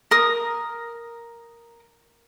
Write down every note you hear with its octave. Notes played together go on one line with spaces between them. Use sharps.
A#4 D#6